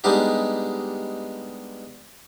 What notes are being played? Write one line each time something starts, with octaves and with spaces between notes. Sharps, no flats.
G3 G#3 B3 D4 D#4 G4